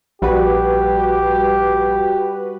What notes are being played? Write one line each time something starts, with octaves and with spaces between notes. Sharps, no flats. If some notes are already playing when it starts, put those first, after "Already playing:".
A#1 G3 F#4 G4 B4